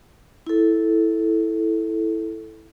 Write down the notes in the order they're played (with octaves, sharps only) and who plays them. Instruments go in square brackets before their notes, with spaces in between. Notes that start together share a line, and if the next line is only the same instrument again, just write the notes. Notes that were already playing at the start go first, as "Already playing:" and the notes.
[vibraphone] E4 A4